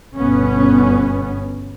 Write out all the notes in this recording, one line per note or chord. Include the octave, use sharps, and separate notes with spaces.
G1 B2 B3 C#4